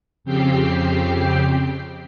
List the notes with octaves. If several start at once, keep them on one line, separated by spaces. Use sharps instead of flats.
F2 C#3 C4 G4 G5 C7